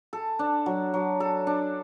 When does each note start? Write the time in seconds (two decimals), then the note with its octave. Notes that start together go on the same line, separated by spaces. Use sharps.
0.13 A4
0.39 D4
0.66 F#3
0.94 F#3
1.20 A4
1.47 D4